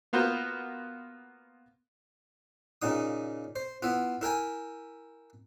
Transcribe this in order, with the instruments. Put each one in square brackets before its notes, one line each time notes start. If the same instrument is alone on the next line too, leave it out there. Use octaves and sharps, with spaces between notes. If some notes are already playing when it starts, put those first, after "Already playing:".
[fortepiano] A#3 B3 F4 F#4 C5
[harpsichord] A#2 C#3 D#4 D#6
C5
B3 E4 F4
E4 A#4 G5 G#5